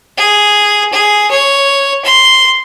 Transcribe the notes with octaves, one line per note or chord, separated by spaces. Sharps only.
G#4
G#4
C#5
C6